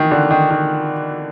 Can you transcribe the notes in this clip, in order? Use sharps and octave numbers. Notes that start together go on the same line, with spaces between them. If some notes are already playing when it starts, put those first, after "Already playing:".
Already playing: D#3 E3
D3
D#3
D#3